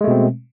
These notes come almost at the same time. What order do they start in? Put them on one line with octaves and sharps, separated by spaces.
G#3 A3 B2 C4